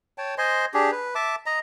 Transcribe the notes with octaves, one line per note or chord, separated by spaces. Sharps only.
C#5 G5 A5
C5 D#5 G#5 C6
D4 G4 G#4
B4
E5 A5 D6
D#5 A#5